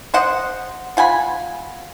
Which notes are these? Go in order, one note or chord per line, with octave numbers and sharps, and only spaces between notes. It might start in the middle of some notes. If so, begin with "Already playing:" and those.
C5 D#5 F#5
F4 F#5 G#5 B5